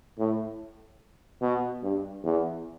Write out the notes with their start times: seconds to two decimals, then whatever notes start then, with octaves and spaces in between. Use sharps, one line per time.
0.19 A2
1.41 B2
1.83 G2
2.24 E2